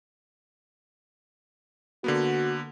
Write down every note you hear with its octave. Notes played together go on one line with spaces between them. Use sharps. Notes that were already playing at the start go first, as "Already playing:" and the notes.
D3 A#3 B3 F#4